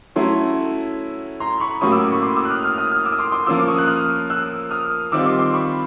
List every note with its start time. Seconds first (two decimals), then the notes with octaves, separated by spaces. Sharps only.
0.16 F#3 A3 C#4 E4 A#5 C6
1.40 A#5 C6
1.60 B5 C#6
1.81 A2 F#3 A#3 C#4 C#6 D#6
1.91 D6 E6
2.12 B5 C#6
2.22 C6 D6
2.36 D6 E6
2.45 F#6
2.50 D#6 F6
2.63 D#6 F6
2.78 D#6 F6
2.92 D#6 F6
3.05 D6 E6
3.12 D#6
3.18 C6 D6
3.32 C6 D6
3.46 F3 A#3 C#4 F4 D6 E6
3.67 C#6 D#6
3.78 F#6
3.87 D#6 F6
4.30 E6 F#6
4.71 D#6 F6
5.12 D#3 G3 C4 F4 D6 E6
5.26 C6 D6
5.39 C6 D6
5.53 B5 C#6